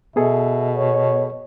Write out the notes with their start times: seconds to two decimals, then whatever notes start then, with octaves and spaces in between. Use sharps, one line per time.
0.16 B2 B3 G#4 A4 E5
0.76 C#5